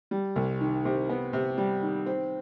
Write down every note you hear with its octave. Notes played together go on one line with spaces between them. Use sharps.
G3
C2
D#3
C3
B3
C3
G3
D#3
C4